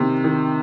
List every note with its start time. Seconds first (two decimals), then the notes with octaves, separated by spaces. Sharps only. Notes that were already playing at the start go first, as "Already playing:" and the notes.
Already playing: C3 D#3
0.24 D#3